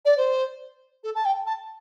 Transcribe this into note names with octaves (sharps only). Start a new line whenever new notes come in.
D5
C5
A4
A5
G5
A5